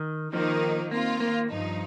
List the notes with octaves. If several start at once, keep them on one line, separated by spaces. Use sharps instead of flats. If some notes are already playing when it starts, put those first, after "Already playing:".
Already playing: D#3
D#3 F3 A#3 D#4
D#3 A#3 C4 F4
A#3
G2 F3 D#4